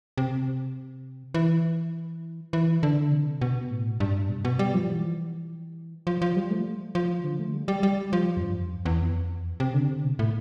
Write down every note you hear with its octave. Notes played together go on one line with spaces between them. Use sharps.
C3
E3
E3
D3
C3
B2
A2
G2
B2
B2
G3
F3
E3
F3
F3
G3
A3
F3
D3
A3
G3
G3
G3
F3
F2
G2
F2
E2
E2
F2
C3
D3
C3
B2
A2